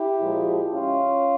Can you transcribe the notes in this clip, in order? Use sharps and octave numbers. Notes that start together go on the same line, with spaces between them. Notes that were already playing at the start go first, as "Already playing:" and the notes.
Already playing: E4 G4
A#2 F3 G#3
C#4 F4